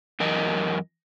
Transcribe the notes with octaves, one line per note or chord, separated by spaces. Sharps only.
F#2 E3 A#4 D#5